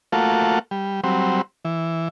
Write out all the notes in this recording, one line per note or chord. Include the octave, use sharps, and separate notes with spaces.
A3 A#3 F4 F#4 A4
G3
F#3 G3 C4
E3